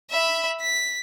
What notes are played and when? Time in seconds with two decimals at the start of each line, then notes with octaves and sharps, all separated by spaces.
0.10 E5 B5
0.61 B6